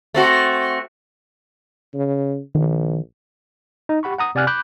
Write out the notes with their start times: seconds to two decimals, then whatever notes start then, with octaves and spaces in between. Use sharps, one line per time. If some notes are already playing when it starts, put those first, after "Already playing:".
0.14 A3 C4 F#4
1.94 C#3
2.55 A#1 D#3
3.89 D#4
4.03 G4 F#5 B5 C#6
4.19 F#5 A#5 D#6
4.35 C3 D5 F#5 G#5 F6 F#6
4.47 B5 D6 F#6 G6